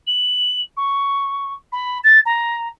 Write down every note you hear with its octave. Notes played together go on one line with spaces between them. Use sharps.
F#7
C#6
B5
A6
A#5